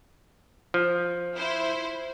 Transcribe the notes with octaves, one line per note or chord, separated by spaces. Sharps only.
F3
E4 C5